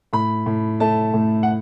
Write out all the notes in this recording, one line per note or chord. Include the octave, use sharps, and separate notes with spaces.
A2 B5
A2
A3 A5
A2
F#5